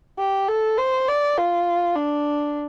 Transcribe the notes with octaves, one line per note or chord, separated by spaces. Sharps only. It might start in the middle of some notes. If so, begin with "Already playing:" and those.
G4
A4
C5
D5
F4
D4